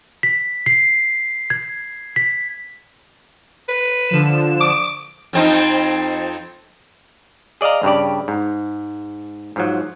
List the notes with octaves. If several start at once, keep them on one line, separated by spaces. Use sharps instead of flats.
B6
C7
G#6
B6
B4
D3 F3 E7
D6
F2 C4 D#4
G#4 D5 D#5 F5 A#5
G2 C#3 G4 D5
G#2
G#2 F3 F#3